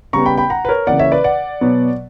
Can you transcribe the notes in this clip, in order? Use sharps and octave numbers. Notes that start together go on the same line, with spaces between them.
C#3 G3 B3 A#5 C#6
G5 B5
G5 B5
F#5 A#5
B4
A#4 C#5
C#3 E3 A#3 D5 F#5
C#5 E5
B4 D5
D5 F#5
B2 F#3 B3